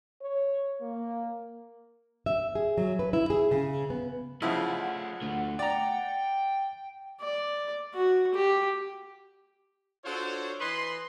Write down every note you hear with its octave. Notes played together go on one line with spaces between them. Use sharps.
C#5
A#3
E5
G#4
F#3
B4
E4
G#4
C#3
B3
C#3 F3 A3 E4 D#5 F#5
D3 A3
D5 G5 A#5
D5
F#4
G4
D4 F4 F#4 A4 C5 C#5
E3 B4 D#5 B5 C6